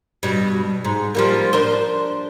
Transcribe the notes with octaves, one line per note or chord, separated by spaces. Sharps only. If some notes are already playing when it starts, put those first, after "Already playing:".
G2 B2
G#2
F3 G3 A#3
D4 A#4 C5